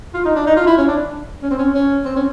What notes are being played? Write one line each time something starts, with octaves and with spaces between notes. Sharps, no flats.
F4
D#4
D4
D#4
F4
E4
C#4
D4
C#4
C4
C#4
C#4
C4
C#4